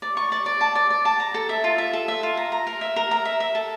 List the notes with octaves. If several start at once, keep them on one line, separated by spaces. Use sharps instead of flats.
D5
C#6
D5
D5
A5
D5
D5
A5
A#5
A4
E5
F4
E5
A4
E5
F4
A#5
A#5
A#4
E5
A#4
A#5
E5
E5
A4